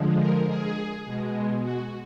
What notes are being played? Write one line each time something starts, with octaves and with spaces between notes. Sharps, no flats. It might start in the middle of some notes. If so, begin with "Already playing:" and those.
Already playing: D3 F3 G#3
A#4
G#4
B2 G#3
F#4